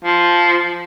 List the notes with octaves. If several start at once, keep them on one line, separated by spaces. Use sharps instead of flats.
F3